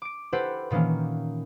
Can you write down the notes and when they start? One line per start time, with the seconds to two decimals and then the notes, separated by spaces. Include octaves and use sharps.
0.02 D6 D7
0.32 E4 G4 A4 B4 C5 F#5
0.70 A#2 D#3 E3 A#3 C#4